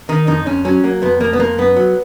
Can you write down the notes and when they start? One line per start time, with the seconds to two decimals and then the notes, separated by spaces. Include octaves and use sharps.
0.09 D#3 D#4
0.27 F2 D#4
0.46 F2 C#4
0.65 F#3 C#4
0.84 F#3 A#3
1.02 F2 B3
1.21 F2 A#3
1.33 B3
1.39 F2 A#3
1.58 F#2 B3
1.76 F#3